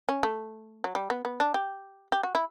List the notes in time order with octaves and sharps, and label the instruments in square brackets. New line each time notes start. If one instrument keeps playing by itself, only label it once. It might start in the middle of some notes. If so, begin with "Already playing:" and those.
[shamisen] C#4
A3
F#3
G3
B3
B3
D4
G4
G4
F#4
E4